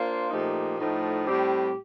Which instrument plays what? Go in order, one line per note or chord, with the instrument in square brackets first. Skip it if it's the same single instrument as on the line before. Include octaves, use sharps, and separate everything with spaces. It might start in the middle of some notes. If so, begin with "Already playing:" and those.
Already playing: [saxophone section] A#3 D4 F4 C5
A#2 F3 A3 D#4 G4
A2 F3 A3 D#4
A2 G3 C4 G4